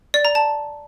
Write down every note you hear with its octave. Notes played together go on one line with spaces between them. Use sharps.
D5
A#5
A5